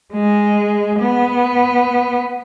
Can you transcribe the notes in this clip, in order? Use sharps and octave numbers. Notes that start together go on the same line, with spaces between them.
G#3
B3